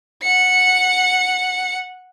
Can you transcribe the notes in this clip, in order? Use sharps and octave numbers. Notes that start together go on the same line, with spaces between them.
F#5 C#7